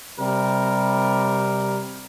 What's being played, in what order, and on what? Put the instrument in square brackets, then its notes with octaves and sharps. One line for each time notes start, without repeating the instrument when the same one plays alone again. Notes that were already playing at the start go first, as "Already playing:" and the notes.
[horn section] C3 G3 A#4